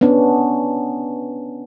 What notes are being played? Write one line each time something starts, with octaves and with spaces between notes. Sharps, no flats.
B3 C#4 D4